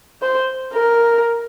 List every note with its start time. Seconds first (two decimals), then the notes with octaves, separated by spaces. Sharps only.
0.22 C5
0.74 A#4